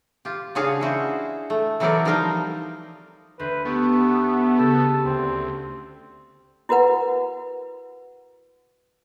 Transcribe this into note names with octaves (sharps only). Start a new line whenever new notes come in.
F4 G4
C#3 D4 F#4 G#4 C#5 F5
E4 F#4 C5
A3
E3 F#3 C4 A4 A#4 D5
F3 G3 D#4 A#4 F5 G5
D2 B4 C5 A#6
A3 B3 F#4 G4
C#3 G4 A4
D2 C4
E4 F#4 A#4 B4 F#5